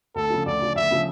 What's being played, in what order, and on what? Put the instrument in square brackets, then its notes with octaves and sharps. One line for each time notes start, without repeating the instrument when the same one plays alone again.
[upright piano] D2 [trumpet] A4
[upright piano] C#3 F3
[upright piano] D2 [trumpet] D5
[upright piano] C#3 F3
[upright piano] D2 [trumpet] E5
[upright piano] C#3 F3